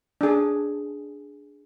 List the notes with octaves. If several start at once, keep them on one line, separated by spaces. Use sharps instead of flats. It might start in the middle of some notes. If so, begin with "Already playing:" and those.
D4 G#4